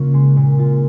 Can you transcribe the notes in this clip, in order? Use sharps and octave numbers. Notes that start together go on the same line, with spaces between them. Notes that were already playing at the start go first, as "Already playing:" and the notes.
Already playing: C#3 A#3 C#4 F4
G#3
A#2
F4